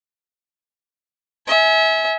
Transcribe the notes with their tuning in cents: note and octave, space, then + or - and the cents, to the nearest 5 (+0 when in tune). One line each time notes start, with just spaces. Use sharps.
E5 -30 G#5 +15